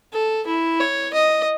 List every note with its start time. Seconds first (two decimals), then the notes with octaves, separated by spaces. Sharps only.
0.13 A4
0.47 E4
0.80 C#5
1.14 D#5